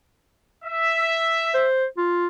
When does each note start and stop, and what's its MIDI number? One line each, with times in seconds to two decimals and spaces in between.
0.65 1.66 76
1.54 1.86 72
1.97 2.28 65